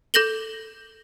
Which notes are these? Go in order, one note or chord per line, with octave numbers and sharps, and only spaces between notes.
A4 G6 A#6 F#7 G7